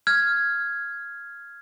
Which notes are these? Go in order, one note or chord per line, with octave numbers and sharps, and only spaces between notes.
F6 G#6